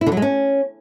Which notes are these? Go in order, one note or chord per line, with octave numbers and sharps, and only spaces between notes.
E4
D3
F#3
G#3
C#4